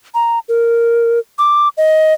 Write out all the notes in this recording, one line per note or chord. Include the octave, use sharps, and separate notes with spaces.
A#5
A#4
D6
D#5